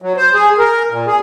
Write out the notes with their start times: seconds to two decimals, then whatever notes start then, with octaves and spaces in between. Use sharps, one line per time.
0.02 F#3
0.17 C5
0.34 G#4
0.58 A#4
0.90 A#2
1.07 G#4